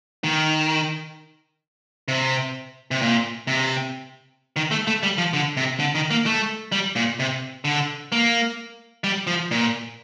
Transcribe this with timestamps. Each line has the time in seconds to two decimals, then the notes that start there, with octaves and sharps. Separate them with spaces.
0.24 D#3
2.08 C3
2.91 C3
3.02 A#2
3.47 C3
4.56 D#3
4.71 A3
4.87 A3
5.03 G3
5.18 F3
5.33 D3
5.57 C3
5.80 D3
5.95 D#3
6.10 A#3
6.26 A3
6.72 G3
6.96 A#2
7.19 C3
7.65 D3
8.12 A#3
9.04 G3
9.27 F3
9.51 A#2